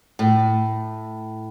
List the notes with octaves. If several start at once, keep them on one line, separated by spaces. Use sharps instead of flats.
A2